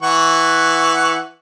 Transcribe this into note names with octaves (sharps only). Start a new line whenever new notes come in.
E3 F#5 C#6